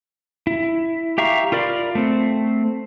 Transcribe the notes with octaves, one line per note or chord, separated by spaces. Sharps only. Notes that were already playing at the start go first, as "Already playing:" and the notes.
E4
G4 E5 F5 A#5 C#6
F4 A#4 D5 B5
A3 C4